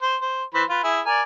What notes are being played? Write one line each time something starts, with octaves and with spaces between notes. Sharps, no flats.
C5
C5
E3 C5 B5
F4 B4
E4 G#4
A#4 D5 G#5